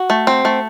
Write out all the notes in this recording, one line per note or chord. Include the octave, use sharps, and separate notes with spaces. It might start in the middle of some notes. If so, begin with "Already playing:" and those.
Already playing: F#4
A3
C4
A3